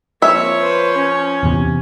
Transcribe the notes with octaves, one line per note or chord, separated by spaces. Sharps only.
F3 A#3 C4 C#5 E5
B4 C5
C#4
E2 C3